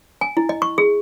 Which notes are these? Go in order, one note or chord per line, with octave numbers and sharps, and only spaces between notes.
G#5
E4
D#5
C#6
G#4